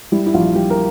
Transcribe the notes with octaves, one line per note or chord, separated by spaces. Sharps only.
G3 E4
E4
A#1 F4
G3 G4
A#4